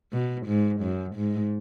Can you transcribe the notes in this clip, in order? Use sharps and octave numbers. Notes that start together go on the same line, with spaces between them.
B2
G#2
F#2
G#2